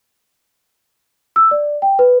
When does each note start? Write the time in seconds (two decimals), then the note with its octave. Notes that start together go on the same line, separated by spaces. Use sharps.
1.36 E6
1.51 D5
1.82 G5
1.99 B4